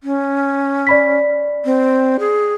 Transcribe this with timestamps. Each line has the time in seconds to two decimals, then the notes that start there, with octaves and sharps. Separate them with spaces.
0.03 C#4
0.87 D5 B5 B6
1.65 C4
2.19 G#4